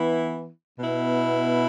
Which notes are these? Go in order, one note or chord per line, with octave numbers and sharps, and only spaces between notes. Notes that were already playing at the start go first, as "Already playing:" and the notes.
Already playing: E3 B3 E4
B2 B3 E4